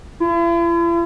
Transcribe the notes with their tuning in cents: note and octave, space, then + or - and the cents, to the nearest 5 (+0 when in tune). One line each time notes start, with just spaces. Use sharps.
E4 +45